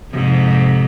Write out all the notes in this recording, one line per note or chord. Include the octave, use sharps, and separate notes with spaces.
F2 G#2 C3